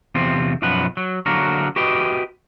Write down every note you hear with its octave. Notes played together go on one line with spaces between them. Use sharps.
E2 C3 C4 F4
B1 F#2 F3 B3 B4 F#5
F#3
D3 F#3 A#3 F#4 A#4
F#4 G4 B4 D#5 G5